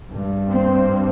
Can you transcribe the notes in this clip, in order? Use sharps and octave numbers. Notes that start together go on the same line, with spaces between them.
G2
C4